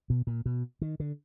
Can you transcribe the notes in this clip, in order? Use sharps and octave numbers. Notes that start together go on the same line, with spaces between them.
B2
A#2
B2
D#3
D3